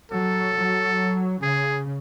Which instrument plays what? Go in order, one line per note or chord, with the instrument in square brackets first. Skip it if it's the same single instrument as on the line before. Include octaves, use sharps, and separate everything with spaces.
[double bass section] F#3 [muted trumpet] A4
[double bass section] F#3
[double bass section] C#3 [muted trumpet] G#4